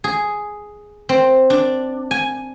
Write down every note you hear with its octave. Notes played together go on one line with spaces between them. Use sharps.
G#4
C4
D4
G#5